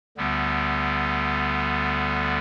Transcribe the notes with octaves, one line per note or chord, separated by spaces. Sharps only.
D2 D3 G3 B3